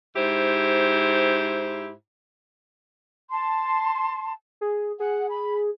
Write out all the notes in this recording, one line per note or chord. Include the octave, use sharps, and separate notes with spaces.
G#2 E4 G4 C5
A5 C6
G#4
G#4 F#5
B5